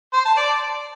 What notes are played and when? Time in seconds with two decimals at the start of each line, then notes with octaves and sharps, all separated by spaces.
0.14 C5
0.25 A5
0.37 D5